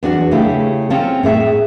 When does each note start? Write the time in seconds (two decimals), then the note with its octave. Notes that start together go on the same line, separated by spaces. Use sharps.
0.03 E2 D4 F#4
0.31 C#3 A3 E4 G4
0.90 C4 C#4 F4 A4
1.23 A2 G#4 E5